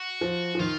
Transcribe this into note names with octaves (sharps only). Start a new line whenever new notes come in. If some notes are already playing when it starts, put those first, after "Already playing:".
Already playing: F#4
F3
F3
D#3 F4